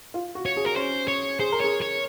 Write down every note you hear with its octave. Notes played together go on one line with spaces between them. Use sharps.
F4
F#4
C#5
G#4
A#4
C#4 C5
C#5
G#4 C5
A#4
G#4 C#5
C#5